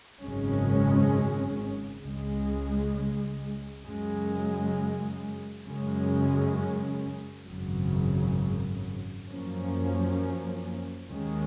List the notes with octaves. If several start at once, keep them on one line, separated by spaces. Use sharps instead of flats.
G#1 F#2 C#3 G#3 C#4
C#2 C#3 G#3
F#2 C#3 G#3
F#2 C#3 G#3 C#4
G#1 F#2 C#3
F#2 F3 A#3 C#4
D#2 D#3 G#3 C#4